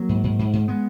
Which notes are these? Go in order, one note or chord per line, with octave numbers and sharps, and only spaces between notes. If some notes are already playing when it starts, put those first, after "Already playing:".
Already playing: F#3 A#3
G#2
G#2
G#2
G#2
G#3 B3